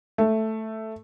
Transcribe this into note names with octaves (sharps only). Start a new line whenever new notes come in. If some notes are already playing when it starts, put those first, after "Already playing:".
A3